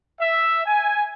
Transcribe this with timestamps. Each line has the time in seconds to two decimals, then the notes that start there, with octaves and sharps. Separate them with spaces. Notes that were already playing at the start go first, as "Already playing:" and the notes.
0.19 E5
0.66 G#5